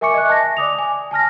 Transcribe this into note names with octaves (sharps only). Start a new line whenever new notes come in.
A#4 E5 G#5 C#6 D6 C#7
D#5 E5 G#5 F#6
A5 A#6
D5 D6 D#6 F7
G#5
G#5 A5 F6 A#6